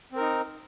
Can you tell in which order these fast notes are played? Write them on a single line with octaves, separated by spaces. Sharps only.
C4 A#4 D#4